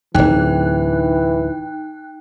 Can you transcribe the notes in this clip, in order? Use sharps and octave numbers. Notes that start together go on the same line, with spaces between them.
D1 G#1 E3 D#4 G5 F#6